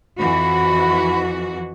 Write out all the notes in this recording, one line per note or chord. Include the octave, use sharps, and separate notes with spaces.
F2 E3 F#4 B5